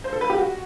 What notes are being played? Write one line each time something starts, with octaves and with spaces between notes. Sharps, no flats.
C5
A4
B4
G4
F#4